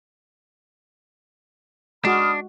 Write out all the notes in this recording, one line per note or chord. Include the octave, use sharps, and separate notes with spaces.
G#3 D4 F#4 B5 D#6 F6